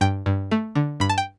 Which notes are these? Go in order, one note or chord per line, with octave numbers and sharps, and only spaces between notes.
G2 G5
G2
A3
D3
G2 B5
A5
G5